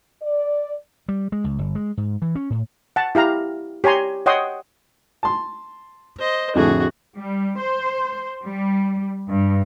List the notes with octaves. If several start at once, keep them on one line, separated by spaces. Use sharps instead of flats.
D5
G3
G#3
C#2
G1
G#3
G#2
E3
C#4
A2
F#5 A5
E4 G4 F5 A#5
G4 C#5 G#5 A#5 C6
C#5 D#5 F#5 G5 C6 D#6
A5 C6
C5 D#5
F2 A2 D3 F#4 G#4
G3
C5
G3
G2